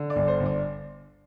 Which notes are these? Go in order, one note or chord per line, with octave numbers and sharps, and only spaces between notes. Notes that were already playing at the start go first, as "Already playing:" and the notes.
Already playing: D3
D5
G1
C5
G1
D5